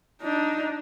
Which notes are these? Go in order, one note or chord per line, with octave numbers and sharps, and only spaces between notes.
D4 D#4